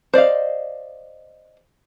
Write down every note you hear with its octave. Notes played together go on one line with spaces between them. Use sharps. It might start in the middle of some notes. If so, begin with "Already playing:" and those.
C5 D5 D#5 F5